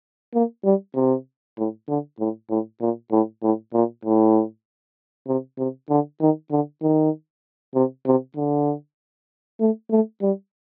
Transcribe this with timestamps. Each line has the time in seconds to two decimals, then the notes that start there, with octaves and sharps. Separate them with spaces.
0.34 A#3
0.65 G3
0.95 C3
1.58 A2
1.88 D3
2.20 A2
2.50 A2
2.81 A#2
3.12 A2
3.42 A2
3.73 A#2
4.05 A2
5.27 C3
5.58 C3
5.90 D3
6.21 D#3
6.51 D3
6.82 D#3
7.75 C3
8.06 C3
8.37 D3
9.60 A3
9.91 A3
10.22 G3